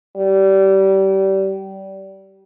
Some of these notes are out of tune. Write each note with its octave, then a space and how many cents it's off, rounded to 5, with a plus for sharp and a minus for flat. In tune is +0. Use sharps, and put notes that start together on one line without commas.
G3 -25